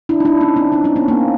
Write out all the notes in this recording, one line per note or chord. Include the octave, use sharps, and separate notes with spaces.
D4 E4
D#4
D4 E4
C#4 D#4
C4 D4
C#4 D#4
C4 D4
B3 C#4
A#3 C4